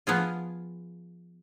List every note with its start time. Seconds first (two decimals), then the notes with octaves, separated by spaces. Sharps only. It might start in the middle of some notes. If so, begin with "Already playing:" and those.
0.07 F3 B3 F4 G#4